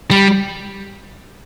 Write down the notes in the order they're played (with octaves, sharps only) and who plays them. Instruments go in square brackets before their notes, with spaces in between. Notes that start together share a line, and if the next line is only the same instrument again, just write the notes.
[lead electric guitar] G3